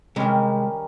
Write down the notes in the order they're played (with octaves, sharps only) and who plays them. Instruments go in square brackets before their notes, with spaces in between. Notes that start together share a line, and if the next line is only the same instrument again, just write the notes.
[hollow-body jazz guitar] C3 G#3 [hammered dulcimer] D#3 G3 C#4